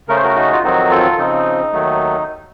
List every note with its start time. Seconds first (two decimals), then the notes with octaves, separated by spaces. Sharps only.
0.08 C#3 A3 C#4 A#4
0.16 C5
0.23 F#4 A#4
0.36 D#4 F#4
0.52 F4
0.63 F2 D#3 F#3 C4 D#4 F#4
0.90 F4 A4
1.18 C#3 F3 C4 D#4
1.73 D#2 D#3 F#3 A3